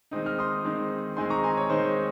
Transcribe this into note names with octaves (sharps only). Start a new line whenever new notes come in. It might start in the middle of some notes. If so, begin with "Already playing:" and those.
D#3 G#3 C4 D#4 D#6
F6
C6 D#6
D#3 G#3 C4 D#4
D#3 G#3 C4 D#4 G#5 C6
A#5 C#6
G#5 C6
C#5
D#3 G#3 C4 D#4 C5